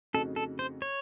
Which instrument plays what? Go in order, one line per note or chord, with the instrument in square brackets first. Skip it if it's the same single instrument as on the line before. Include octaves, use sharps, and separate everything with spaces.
[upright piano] F2 C#3 A3 D#4 F#4 [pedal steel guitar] A4
[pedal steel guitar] A4
C5
C#5